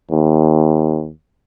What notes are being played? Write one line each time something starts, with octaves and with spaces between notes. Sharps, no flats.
D#2